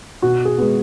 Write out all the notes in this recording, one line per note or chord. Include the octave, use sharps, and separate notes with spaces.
B2 F#4
G#4
G#3 B3